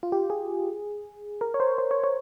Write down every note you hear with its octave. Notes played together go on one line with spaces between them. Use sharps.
F4
G4
G#4
A#4
C#5
C5
C5
C#5
C#5